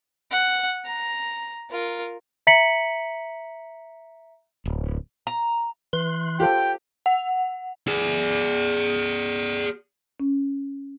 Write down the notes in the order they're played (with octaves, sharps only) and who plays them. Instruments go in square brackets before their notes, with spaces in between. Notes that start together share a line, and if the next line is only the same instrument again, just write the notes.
[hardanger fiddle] F#5
A#5
F4 A#4
[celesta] E5 A#5 B6 C#7 F#7
[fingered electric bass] D1
[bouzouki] A#5
[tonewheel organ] E3 C6 F#6
[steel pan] F4 A4 C5 [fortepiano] G4 [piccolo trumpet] G5
[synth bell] F#5
[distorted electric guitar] G#4 D5
[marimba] C#4